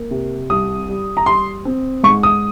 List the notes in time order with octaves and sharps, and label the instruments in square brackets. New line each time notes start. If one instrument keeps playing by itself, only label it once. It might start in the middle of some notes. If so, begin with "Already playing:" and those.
Already playing: [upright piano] A#3
C3
C2 D#6
G3
A#5
G3 C6
C4
G#2 C#6
D#6